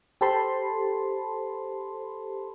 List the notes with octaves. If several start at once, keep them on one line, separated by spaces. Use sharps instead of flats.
G4 A4 C5 A5 B5 C6